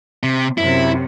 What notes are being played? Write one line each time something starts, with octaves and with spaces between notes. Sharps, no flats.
C3
F#2 C3 E4